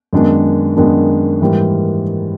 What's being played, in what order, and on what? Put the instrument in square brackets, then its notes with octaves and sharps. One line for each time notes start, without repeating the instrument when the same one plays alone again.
[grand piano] F#2 D#3 G#3 B3 D4
F#2 D#3 G#3 B3 D4
G#2 E3 G3 A#3